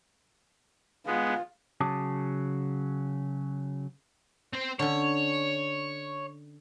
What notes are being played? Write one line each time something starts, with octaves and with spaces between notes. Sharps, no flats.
G#3 B3 F4
C#3 F#3 A5 D6 D#6
C4 C5
D3 C#4 C#5